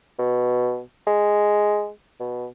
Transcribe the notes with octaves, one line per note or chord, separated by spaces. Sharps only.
B2
G#3
B2